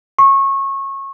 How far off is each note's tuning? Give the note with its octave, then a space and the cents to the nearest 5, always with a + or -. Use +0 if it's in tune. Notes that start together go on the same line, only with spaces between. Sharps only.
C#6 -25